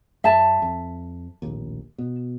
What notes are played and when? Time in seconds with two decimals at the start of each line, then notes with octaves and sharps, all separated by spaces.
0.24 F#2 E5 A5
0.62 F2
1.42 D1 A#1 D#2
1.98 B2